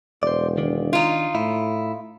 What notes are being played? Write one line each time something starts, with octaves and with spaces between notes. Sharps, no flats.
E1 C5 D5
D#3 D4
D#4 F4
A2 E4